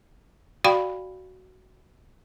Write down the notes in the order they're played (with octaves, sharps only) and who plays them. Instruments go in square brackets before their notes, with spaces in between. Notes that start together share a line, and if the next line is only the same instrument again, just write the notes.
[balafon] F#4 D5 F5 G5 B5 C#6